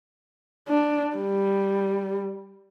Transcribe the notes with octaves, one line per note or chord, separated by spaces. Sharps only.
D4
G3